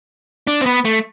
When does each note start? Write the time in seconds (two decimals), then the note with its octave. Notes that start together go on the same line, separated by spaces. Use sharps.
0.47 D4
0.61 C4
0.66 B3
0.85 A3